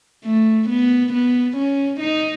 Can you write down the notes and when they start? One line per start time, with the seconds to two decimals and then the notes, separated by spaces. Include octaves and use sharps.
0.25 A3
0.69 B3
1.13 B3
1.57 C#4
2.00 D#4